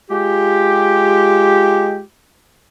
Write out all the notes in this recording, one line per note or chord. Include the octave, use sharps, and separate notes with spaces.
G#3 F4 G4